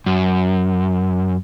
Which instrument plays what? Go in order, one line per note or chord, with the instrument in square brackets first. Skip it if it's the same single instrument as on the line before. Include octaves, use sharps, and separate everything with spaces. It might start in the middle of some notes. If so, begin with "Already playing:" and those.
[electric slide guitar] F#2